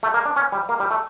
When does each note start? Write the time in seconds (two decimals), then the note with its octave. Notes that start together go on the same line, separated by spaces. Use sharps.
0.03 A3
0.14 A#3
0.26 D4
0.36 C#4
0.52 G3
0.69 A#3
0.80 G3
0.91 A3